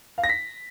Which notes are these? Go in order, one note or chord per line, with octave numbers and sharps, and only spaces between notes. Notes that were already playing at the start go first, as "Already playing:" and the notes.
F5
A#6
B6